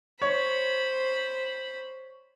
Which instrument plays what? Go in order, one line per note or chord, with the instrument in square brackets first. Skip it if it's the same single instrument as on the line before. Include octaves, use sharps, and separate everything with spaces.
[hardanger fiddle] C5 B5 [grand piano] C#5